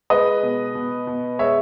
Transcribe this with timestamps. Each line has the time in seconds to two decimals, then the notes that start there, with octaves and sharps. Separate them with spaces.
0.10 G#3 B4 D#5
0.43 B2
0.75 B2
1.07 B2
1.39 G#3 C#5 E5